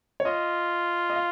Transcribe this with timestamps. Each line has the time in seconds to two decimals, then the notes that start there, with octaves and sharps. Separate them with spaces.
0.20 C#5
0.25 F4 D#5
1.10 D#5
1.16 F5